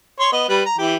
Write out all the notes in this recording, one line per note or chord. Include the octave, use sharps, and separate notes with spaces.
C#5 C6
B3 D#5
G3 B4
A#5
E3 G4